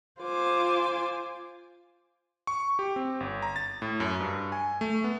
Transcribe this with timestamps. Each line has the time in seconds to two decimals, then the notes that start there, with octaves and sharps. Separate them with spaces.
0.20 F4 C5 G#5 D6
2.47 C#6
2.79 G4
2.96 C4
3.20 G1
3.42 A#5
3.56 A6
3.82 A2
4.00 F#2
4.20 G2
4.52 G#5
4.81 A3
5.04 B3